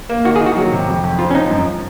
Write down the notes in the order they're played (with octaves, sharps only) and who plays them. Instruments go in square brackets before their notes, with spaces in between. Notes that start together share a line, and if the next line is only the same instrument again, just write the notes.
[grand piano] A#3
[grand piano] D#3 [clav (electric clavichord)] F#4
[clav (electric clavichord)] G#4
[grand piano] D#3
[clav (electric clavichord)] F#4
[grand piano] F#3 [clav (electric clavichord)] F#4
[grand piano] C3
F2
F2
[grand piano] C4 [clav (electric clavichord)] F4
[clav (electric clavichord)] C#4
[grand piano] F3 [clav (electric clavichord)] D#4
[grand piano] F#2